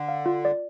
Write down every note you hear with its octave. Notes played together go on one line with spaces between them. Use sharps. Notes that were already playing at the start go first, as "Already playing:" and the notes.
Already playing: D3
F5
F4
D5